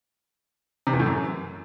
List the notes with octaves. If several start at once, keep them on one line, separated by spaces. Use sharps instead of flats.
C3
E2
A2
F#2